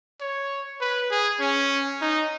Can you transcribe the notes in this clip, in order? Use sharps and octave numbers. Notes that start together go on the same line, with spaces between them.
C#5
B4
G#4
C#4
D#4